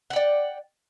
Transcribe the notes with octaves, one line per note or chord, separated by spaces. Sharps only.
D5 F#5 G5